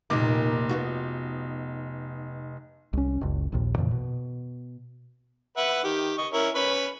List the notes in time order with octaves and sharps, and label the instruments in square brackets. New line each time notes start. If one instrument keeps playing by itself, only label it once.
[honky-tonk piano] F1 D#4 D6 [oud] A#2 D#3 A#3
[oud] B3 F4 F#4
[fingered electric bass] C2 C#4
F#1 C#2
A#1 D#2 A#2
F2 A#2 C#3 E3
B2
[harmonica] B4 E5 F#5
D#3 G4
D#5 C#6
C#4 E4 A#4
C#4 B4 B5